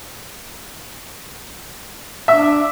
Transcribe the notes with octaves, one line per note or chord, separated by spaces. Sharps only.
D4 E5